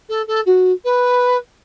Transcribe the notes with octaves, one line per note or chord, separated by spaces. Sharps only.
A4
A4
F#4
B4